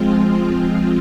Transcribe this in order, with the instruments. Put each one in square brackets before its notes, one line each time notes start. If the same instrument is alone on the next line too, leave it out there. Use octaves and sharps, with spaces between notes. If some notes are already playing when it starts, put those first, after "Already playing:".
Already playing: [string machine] F3 G#3 C4 F4